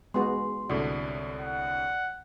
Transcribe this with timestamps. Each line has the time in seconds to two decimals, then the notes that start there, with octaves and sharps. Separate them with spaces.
0.14 G#3 B3 F#4 C6
0.70 C2 A2 D3 F#4 D5
1.41 F#5